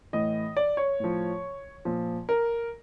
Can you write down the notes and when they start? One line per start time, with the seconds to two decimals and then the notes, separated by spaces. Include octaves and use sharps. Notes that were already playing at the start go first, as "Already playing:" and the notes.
0.13 A2 E3 D#5
0.57 D5
0.77 C#5
1.00 A2 F3
1.85 A#2 F3
2.29 A#4